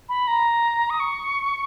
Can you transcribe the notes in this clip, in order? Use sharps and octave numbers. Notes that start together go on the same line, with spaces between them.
B5
A#5
D#6
C#6